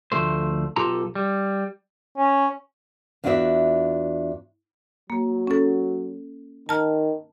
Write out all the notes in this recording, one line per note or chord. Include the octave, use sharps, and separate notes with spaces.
D2 F3 A3 C5
B1 F4 G4 A4 A5 A#5
G3
C#4
E2 D4 F4 F#4 D5 E5
F#3 A#3
C#4 A4
D#3 A5 A#5 F6